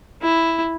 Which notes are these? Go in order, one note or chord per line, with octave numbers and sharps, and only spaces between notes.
E4